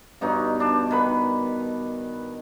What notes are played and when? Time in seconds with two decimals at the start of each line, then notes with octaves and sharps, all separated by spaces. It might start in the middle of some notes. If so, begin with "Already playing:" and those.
0.21 G2 B2 D#4 C#5
0.60 D4 A5
0.91 D#3 B4 B5